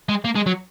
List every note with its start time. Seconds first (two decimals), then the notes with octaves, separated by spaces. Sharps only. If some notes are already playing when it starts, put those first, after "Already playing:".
0.09 G#3
0.25 A#3
0.36 G#3
0.46 F#3